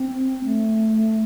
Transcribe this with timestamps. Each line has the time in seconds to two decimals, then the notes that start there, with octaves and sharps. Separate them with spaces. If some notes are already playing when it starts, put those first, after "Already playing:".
Already playing: C4
0.44 A3